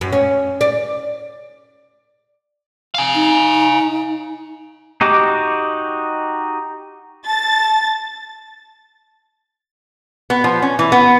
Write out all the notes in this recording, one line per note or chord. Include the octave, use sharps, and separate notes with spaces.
F#2
C#4
D5
F5 G#5
D#4
D#4 F#4 G4 D#5 D6
A5 A6
B3
F3
C#4
E3
B3